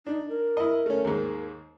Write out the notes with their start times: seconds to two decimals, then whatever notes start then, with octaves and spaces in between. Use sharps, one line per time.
0.07 D4 D#4
0.29 A#4
0.57 E4 D#5
0.86 A3 C#4
1.04 D#2 G#2